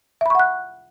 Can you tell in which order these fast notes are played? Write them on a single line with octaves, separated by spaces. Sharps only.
E5 B5 C#6 F#5 F#6